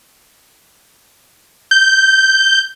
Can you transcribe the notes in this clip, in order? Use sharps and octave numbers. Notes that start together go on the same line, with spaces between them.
G6